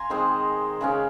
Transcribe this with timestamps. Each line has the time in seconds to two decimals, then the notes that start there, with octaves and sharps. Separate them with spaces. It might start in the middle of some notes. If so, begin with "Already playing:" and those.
Already playing: F5 G#5 A#5 C6
0.10 D#3 G#3 C4 C5 D#5
0.81 C#3 G#3 C#4